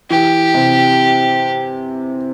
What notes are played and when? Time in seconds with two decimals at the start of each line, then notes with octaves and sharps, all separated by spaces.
0.10 E3 G4
0.54 C3